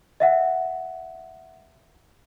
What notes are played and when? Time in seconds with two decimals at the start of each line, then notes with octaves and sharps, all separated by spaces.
0.20 D#5 E5 F#5